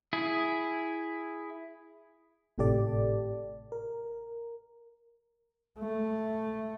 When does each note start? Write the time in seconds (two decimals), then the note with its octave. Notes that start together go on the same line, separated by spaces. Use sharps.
0.13 E4 G#4
2.58 G#1 A2 C3 G4 A4 D5
3.72 A#4
5.79 A3